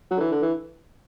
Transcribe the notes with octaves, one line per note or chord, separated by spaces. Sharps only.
F#3
D3
E3
D3
E3